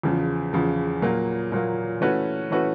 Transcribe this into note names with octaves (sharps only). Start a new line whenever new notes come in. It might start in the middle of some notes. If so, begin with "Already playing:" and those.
E2 C#3 F3
E2 C#3 F3
A#2 F#3 A#3
A#2 F#3 A#3
E3 A3 C#4 F#4 B4
E3 A3 C#4 F#4 B4